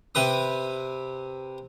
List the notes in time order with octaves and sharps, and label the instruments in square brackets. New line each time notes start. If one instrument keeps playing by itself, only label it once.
[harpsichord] C3 B4 D#6